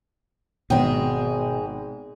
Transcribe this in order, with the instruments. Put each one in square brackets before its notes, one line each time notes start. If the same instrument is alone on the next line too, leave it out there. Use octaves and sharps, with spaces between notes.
[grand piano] G#1 G5 [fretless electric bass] B2 [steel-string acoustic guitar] G#3 G#4